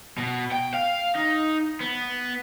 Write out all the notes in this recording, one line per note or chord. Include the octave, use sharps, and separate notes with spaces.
B2
G5
F5
D#4
B3